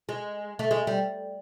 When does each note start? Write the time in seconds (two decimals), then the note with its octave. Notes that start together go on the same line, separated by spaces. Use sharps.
0.09 G#3
0.59 A3
0.71 G#3
0.87 G3